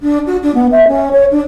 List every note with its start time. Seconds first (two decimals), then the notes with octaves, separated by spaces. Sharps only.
0.02 D4
0.27 F#4
0.42 D4
0.54 B3
0.72 E5
0.87 C#4
1.13 C#5
1.31 D4